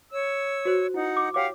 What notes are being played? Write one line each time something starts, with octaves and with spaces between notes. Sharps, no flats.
C#5 E6
F#4 C5
D#4 E4 F#5
D6
G4 C#5 F5 F#5 D6